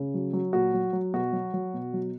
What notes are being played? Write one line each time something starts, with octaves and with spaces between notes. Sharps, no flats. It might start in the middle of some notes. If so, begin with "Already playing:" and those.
Already playing: C#3
F#3
F#3
A#2 F#4
F#3
F#3
B2 F#4
F#3
F#3
B2
F#3